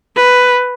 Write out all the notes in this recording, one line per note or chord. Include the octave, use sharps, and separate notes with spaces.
B4